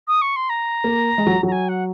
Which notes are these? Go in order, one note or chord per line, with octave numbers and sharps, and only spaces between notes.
D#6
C#6
C6
A#5
A#3
G#3
F#3
F#3 A#5
G#5
F#5